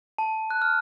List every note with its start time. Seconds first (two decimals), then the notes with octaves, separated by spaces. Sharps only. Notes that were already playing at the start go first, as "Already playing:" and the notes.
0.18 A5
0.50 F#6
0.62 F6